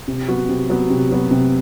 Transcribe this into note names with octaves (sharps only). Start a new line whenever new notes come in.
C3
F#3 B3 F#4
C3
F#3 B3 F#4
C3
F#3 B3 F#4
C3